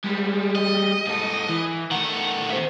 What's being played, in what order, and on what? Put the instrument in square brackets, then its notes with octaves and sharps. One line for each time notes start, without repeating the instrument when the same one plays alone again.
[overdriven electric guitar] G3 G#3
[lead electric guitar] D#5
[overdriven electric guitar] G#2 A4
E3
[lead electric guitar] D#3 A3 [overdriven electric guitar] F#5
[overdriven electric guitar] C5 E5